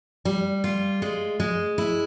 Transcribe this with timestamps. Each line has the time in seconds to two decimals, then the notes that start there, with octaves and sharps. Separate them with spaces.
0.25 G3
0.64 F4
1.02 G#3
1.40 G#3
1.78 E4